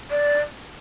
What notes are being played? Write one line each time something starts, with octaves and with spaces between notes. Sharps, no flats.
D5